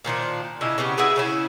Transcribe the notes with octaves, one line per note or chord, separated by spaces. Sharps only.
A#2 D#3 F3 D4
C#3 D4 E4 D#5
C#3 B3 C#4 G4
E4 F#4 G#4 B4
C#3 C#4 E4